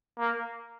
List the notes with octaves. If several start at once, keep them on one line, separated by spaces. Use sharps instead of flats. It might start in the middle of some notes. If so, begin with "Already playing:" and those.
A#3